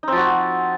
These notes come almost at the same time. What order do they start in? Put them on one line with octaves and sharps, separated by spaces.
D#4 C4 F3 F#4